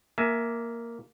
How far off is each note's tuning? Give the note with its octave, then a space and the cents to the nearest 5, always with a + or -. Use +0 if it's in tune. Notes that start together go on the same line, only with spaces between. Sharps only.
A#3 +0 E5 +5 G#5 +25